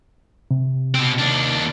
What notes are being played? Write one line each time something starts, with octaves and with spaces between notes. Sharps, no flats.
C3
B2 C4
D#2 D4